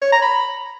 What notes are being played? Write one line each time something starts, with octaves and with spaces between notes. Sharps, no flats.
C#5
A#5
B5